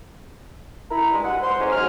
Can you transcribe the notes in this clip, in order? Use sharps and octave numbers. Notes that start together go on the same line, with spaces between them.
E4 A#5 B5
G2 G#3
F#5
C5 C6
A2 G#3 A#3 C#4
G#2 F#3 G#5 F6